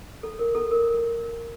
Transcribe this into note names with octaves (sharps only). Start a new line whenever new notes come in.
A4
A#4
A4
A#4
A#4